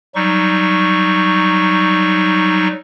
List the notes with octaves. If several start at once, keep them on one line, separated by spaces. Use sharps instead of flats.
F#3 G3 D#4 C#6